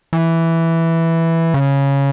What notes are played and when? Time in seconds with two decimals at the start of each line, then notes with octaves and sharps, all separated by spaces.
0.13 E3
1.54 C#3